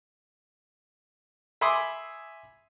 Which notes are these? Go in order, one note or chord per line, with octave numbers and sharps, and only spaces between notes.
E5 G#5 B5 C6 D6 D#6